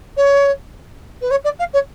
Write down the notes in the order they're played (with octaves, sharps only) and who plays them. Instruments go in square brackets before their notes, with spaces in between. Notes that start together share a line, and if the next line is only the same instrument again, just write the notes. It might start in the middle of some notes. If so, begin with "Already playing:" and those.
[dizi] C#5
B4
C#5
D5
F5
C#5